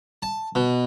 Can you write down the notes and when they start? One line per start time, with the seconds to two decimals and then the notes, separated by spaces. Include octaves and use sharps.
0.23 A5
0.55 B2